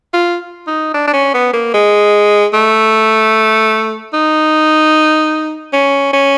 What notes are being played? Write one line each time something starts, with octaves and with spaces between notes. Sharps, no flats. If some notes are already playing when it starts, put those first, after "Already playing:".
F4
D#4
D4
D4
C#4
B3
A#3
G#3
A3
D#4
C#4
C#4